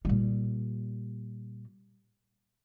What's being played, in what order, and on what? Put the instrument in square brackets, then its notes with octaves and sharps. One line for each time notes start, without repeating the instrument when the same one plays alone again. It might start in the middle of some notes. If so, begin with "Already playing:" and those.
[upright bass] A#2 G3